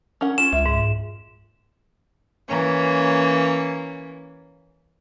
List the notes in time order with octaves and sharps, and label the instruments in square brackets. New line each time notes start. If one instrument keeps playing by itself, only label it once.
[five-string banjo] C#4 A#4 F#5
[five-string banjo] C#4 F4 [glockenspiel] E7
[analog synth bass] C#2 [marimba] E5
[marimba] G#2
[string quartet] E3 A#3 C#4